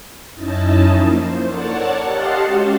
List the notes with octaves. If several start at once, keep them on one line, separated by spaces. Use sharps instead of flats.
F#2 C#4 D#4 E4 D#5 A5
F3 A#3
C5
A4 A#4 C#5 D5 F#5 A5
G4 D#5 F5 F#5 A5 C6
G#3 C#4 F#4 G4